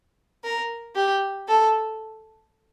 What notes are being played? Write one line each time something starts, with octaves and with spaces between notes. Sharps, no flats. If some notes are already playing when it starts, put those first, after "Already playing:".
A#4
G4
A4